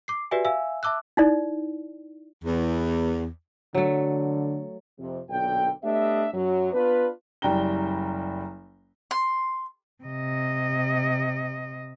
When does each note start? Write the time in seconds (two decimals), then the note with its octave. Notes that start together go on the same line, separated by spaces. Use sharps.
0.08 D6 C7
0.31 F#4 G4 B4 D5 E5 G#5
0.45 E5 F5 G#5 E6
0.83 E5 A5 D6 E6 F#6
1.17 D#4 E4 D5
2.44 E2
3.75 D3 F#3 A3
4.99 F2 C3
5.29 B1 A#2 D3 G5
5.83 A3 B3 D4 G4 D#5 E5
6.33 F#2 F#3
6.73 B3 D4 F4 B4
7.42 F#1 G3 G5 A#5 G7
9.11 C6
10.03 C3 D#5